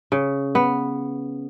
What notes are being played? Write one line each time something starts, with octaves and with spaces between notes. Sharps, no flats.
C#3
B3